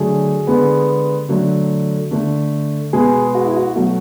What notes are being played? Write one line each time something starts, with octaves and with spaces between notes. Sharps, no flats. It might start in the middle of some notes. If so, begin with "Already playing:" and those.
Already playing: D3 F#3 A3 G#4
D3 G#3 B3
D3 F#3 A3
D3 A3
B2 G#3 B3 G#4
F#4
E4
F#4
B2 F#3 A3 F#4